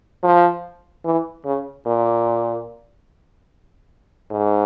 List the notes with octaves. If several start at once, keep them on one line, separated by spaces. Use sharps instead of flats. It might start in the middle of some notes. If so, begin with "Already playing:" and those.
F3
E3
C#3
A#2
G#2